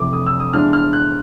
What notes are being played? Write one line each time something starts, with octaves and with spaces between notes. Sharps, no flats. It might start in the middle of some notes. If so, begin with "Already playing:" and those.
Already playing: F2 C3 E3 A3 D6
D#6
E6
D#6
E3 G#3 B3 D4 F4 F6
F6
F#6